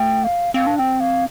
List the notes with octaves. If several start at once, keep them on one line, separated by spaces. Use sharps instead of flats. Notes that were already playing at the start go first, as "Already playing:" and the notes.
Already playing: A3 G5
F5
C4 F5
D4
C4 G5
F5